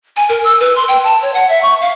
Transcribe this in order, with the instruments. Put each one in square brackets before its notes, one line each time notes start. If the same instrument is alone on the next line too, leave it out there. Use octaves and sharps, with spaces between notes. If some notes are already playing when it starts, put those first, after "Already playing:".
[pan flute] G#5
A#4
E6
B4
C6
G5
A5
C#5
F#5
E5
C#6
F5